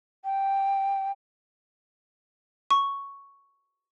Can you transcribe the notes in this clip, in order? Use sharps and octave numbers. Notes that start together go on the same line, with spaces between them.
G5
C#6